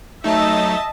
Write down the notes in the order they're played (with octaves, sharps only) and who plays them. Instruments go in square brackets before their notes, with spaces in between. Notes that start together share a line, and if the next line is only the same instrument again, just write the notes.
[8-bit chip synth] F#3 A3 D#4 [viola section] D#5 E5 [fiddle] A5